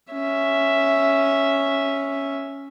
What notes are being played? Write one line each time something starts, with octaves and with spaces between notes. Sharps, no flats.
C#4 E5